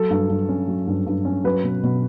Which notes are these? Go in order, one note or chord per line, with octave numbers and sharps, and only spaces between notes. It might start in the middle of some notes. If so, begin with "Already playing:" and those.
Already playing: F#3 A4
G2
G2
C#4
F#3
G2
G2
C#4
F#3 B4
B2
B2